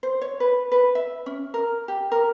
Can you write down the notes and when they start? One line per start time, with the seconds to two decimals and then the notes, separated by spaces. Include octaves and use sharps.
0.03 C5
0.21 C#5
0.40 B4
0.72 B4
0.95 E5
1.26 C#4
1.54 A#4
1.88 G4
2.12 A#4